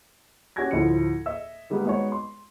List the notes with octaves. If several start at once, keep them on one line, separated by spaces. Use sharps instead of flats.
C#4 F#4 G4 G#5 G#6 A#6
D2 A2 F3 E4 C#7
D#5 E5 E6
D#3 G3 G#3 A#3 B3
G#3 B3 D#4 F#4 G#4 C#5
C6